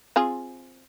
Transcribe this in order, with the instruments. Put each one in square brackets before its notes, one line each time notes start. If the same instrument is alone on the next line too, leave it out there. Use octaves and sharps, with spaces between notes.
[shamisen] C4 F4 G#4